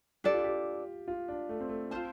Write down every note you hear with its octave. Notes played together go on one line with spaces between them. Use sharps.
D4 G4 A4 D5
F4
G4
F4
D4
A3
C4
A3
C4 F4 C5 A5